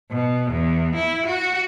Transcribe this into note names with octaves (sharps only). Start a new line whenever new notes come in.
B2
E2
E4
F#4